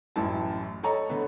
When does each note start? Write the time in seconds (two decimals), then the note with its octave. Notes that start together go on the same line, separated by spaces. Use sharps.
0.16 A1 F#2 E4 A5
0.83 A4 C#5 D#5 A#5
1.10 D3 A3 B3